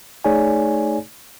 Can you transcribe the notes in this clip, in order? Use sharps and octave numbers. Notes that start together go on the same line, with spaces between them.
A3 D#4 G#4 C#5 D5 G#5